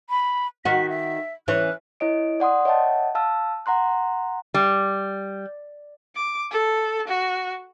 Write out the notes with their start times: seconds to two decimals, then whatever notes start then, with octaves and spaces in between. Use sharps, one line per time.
0.10 B5
0.65 D#3 F#4 B6
0.89 E5
1.48 E3 C#4 F#6
2.00 E4 C#5 D#5 D7
2.40 D5 F#5 C6 D#6
2.65 C#5 D#5 E5 F#5 G5 A5
3.15 F5 A5 E6
3.66 F#5 A#5 C6 F#6
4.54 G3
6.15 D6
6.51 A4
7.08 F#4